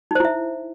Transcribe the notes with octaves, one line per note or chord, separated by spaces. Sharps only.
D#4 E4 C5 E5